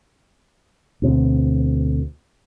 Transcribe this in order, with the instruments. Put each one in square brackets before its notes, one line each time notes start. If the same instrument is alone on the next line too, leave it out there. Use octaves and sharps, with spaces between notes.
[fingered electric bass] D2 B2 C4